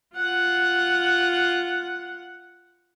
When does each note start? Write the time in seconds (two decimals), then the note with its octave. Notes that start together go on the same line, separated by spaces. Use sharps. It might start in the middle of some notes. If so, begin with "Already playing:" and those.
0.16 F4 F#5